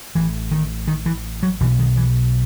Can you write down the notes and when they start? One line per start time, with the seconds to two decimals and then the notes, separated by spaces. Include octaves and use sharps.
0.15 A1 A2 E3
0.51 D#3
0.87 D#3
1.06 E3
1.43 F#3
1.60 B1 B2 E3
1.79 D#3
1.97 E3